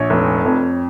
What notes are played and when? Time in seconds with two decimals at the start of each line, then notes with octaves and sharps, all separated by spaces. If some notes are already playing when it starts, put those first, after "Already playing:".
Already playing: A#1 C#5
0.10 F1
0.45 F2